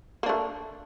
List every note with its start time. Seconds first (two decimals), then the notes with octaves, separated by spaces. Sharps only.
0.23 A#3
0.26 D4
0.29 A3